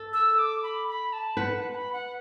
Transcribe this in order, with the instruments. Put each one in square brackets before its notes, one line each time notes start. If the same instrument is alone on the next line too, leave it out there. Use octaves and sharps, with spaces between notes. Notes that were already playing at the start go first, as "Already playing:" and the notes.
Already playing: [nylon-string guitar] A4
[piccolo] E6
D6
B5
B5
A5
[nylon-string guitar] B4 [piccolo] F#5
[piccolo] F#5
B5
F#5